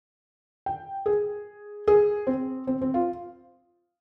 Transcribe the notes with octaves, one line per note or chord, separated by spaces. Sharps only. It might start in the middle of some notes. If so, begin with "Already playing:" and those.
G5
G#4
G#4
C4
C4
C4
F4